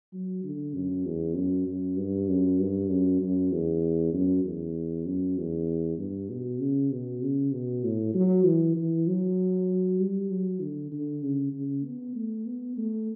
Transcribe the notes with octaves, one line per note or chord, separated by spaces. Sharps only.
F#3
D3
F#2
E2
F#2
F#2
G2
F#2
G2
F#2
F#2
E2
F#2
E2
F#2
E2
G2
B2
C#3
B2
C#3
B2
A2
F#3
E3
E3
F#3
G3
F#3
D3
D3
C#3
C#3
B3
A3
B3
A3